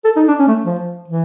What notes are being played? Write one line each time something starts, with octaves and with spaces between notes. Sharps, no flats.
A4
D#4
D4
C#4
A3
F3
E3